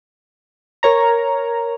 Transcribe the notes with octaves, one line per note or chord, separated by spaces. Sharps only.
A#4 C#5 A#5